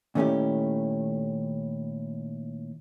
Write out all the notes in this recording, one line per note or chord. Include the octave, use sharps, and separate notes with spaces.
A#2 D#3 A3 C#4 E4 G4